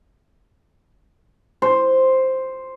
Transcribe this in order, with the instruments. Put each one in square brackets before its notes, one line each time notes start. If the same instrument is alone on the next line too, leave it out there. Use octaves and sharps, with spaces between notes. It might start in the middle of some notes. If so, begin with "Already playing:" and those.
[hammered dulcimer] C5